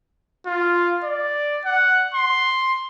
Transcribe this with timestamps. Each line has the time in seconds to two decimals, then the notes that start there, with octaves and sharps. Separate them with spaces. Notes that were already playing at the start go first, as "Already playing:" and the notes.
0.46 F4
1.04 D5
1.66 F#5
2.14 C6